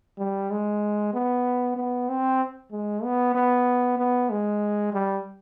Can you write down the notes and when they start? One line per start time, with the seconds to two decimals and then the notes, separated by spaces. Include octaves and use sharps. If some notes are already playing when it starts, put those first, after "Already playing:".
0.18 G3
0.50 G#3
1.13 B3
1.76 B3
2.09 C4
2.72 G#3
3.04 B3
3.34 B3
3.98 B3
4.30 G#3
4.93 G3